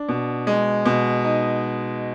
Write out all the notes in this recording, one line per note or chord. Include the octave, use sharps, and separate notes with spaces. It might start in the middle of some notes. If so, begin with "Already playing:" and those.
Already playing: D4
B2
G#3
B2
D#4